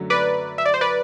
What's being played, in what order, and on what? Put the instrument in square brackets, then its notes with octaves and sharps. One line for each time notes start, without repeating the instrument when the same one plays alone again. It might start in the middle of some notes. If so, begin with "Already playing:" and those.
Already playing: [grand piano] F#2 D3 F#3 A3
[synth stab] B4 D5
E5
D5
C5
B4 D5